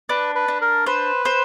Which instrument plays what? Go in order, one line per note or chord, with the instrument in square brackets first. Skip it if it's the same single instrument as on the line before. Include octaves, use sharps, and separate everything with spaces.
[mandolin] D4 [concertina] B4
[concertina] B4
[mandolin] D4
[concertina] A#4
[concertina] B4 [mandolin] C5
[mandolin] C5